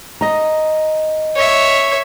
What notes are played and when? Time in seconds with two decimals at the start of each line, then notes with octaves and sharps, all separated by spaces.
0.21 D#5 A#5
1.36 C#5 E5